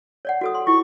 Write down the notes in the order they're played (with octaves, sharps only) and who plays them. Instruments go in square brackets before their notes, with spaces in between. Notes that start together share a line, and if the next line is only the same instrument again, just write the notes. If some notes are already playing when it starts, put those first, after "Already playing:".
[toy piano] C#5 D5 F#5
F#4 A4 D#6
C6
[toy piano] E4 F4 [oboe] C#6